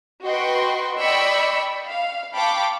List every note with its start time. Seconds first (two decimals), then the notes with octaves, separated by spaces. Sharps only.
0.25 F#4 B4 D#5 G5 C6 C#6
0.97 D5 D#5 G5 B5 C#6 E6
1.87 F5
2.34 F5 G5 A5 B5 C#6 D6